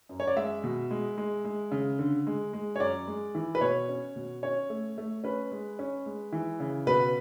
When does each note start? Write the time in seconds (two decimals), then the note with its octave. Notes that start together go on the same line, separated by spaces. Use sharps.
0.09 F#2
0.20 C#5
0.27 D5
0.36 G#3 E5
0.64 B2
0.91 G#3
1.18 G#3
1.45 G#3
1.72 C#3
1.99 D3
2.27 G#3
2.53 G#3
2.76 C#5
2.80 F#2 D5
3.07 G#3
3.35 E3
3.55 B4
3.61 B2 C#5
3.89 C#4
4.16 B2
4.43 C#4 C#5
4.70 A3
4.98 A3
5.24 C#4 B4
5.52 G#3
5.79 C#4
6.06 G#3
6.33 E3
6.60 C#3
6.87 B2 B4